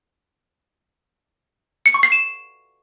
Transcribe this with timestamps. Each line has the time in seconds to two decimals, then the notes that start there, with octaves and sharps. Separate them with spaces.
1.86 C#7
1.94 C#6
2.03 C7
2.12 E7